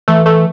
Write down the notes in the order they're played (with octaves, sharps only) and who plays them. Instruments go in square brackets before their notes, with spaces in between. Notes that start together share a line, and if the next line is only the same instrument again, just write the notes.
[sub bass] E3 [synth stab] A3
[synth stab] A3